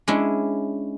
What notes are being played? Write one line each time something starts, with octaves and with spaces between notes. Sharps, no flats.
G#3 C#4 D4 E4